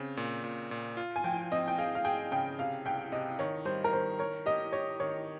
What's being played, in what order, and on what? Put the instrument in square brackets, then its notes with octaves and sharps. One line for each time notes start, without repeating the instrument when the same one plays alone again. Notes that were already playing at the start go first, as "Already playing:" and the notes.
Already playing: [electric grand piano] C#3 C4
A#2
A#2
A#2
F4
[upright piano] G#5
[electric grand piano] F3 [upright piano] G5
[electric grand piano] C4 [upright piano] D#5
[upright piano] G5
[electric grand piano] G#4 [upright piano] F5
[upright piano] F5
[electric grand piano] G#4 [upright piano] G5
[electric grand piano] C#3 [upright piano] G5
[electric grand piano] C3 [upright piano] F5
[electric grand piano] C2 [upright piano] G5
[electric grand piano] C3 [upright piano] D#5
[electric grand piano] D#3 [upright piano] C#5
[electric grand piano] G3 [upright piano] C5
[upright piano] A#4
[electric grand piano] D#3 [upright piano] C5
[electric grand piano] A#4 [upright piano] C#5
[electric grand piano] G4 [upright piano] D#5
[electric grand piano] G4 [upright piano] C#5
[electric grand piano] D#3 [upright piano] C#5